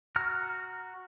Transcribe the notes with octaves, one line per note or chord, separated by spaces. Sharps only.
F#4 A#5 F6